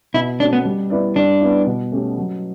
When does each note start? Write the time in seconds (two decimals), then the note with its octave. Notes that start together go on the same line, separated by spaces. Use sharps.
0.14 B2 E4
0.40 A3 C#4 D4 F#4
0.53 B3
0.65 G3
0.90 B3 E4 B4 D5
1.15 G3 D4
1.41 B3 E4
1.66 B2
1.92 A3 C#4 G4
2.18 F#3